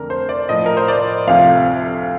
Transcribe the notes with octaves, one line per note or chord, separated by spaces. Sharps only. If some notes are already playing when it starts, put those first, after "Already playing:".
Already playing: F2 D3 A3 A#4
C5
D5
A2 F3 A3 D#5
A#4
C5
D5
D2 C3 F3 F5